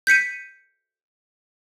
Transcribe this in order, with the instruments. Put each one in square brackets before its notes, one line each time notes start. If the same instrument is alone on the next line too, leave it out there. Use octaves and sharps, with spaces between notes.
[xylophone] G6 B6 C#7 D#7